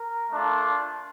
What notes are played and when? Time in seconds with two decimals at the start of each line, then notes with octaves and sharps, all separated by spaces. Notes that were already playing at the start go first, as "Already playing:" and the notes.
Already playing: A#4
0.31 A3 D4 F4